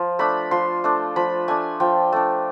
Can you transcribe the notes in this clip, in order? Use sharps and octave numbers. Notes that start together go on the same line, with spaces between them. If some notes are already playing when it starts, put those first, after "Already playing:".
Already playing: F3
A3 D4 B5
F3 C6
A3 D4
F3 B5
A3 D4 G#5
F3 G5
A3 D4